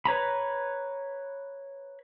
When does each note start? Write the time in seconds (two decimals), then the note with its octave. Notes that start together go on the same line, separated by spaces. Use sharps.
0.05 B4 C#5 A#5 B5